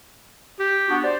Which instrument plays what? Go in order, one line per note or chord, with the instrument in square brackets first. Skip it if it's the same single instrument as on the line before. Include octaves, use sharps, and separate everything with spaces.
[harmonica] G4
[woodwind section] B3 D4 F#4
C5 D5